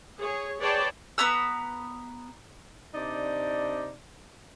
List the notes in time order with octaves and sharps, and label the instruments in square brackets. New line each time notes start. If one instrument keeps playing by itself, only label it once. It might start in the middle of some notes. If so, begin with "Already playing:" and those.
[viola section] G#4 C#5
G#4 B4 C#5 D5 G5 A5
[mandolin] B3 B4 A#5 E6
[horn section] C3 D4 D#4 D5